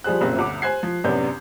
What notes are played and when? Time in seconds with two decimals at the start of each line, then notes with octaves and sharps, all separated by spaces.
0.04 F3 G3 G#4 C5 F#6
0.21 F#1 A#2 C4
0.36 G1 D2 D6
0.62 C5 G#5 F#6 G#6 C7
0.83 F3
1.04 A1 F#2 C3 B3 D4 G6